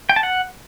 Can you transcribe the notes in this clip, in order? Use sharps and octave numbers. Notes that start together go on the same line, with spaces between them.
G5
A5
F#5